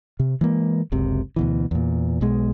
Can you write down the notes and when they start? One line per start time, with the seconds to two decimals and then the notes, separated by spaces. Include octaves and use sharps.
0.20 C3
0.41 E3 G#3 A#3
0.92 F#1 C#2 C3
1.36 D2 B2 E3
1.71 E2 A#2
2.21 B1 B2 G#3